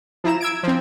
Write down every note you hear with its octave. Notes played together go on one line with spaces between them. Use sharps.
F3 E4 A#5 E7
E6 G#6 D7
F3 C4